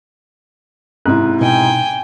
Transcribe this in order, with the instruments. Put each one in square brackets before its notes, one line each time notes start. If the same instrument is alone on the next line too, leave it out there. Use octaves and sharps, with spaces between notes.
[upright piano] G#2 C3 E4 [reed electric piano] F#6
[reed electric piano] B2 D#4 [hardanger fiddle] G5 G#5